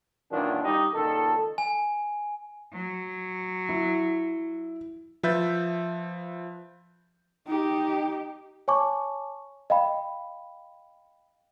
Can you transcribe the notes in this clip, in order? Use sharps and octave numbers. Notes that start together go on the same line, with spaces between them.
F#2 A#2 D#3 E3 D4 F4
G3 D#4 G4
C#2 A#2 D#3 A4
G#5
F#3
E4
F3 B4 E5 G6 A6
D#4 G4
C#5 G#5 A5 C#6 D6
D#5 F5 G5 B5